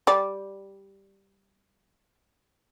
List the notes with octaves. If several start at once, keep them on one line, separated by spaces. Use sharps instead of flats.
G3 D5